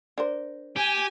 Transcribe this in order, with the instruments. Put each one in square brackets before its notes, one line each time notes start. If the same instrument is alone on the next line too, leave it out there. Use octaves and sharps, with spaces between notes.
[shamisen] D4 A#4 C5
[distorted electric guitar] G4 [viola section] G#5